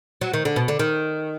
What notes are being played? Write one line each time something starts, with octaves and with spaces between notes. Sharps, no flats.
F#3
D#3
D3
B2
D3
D#3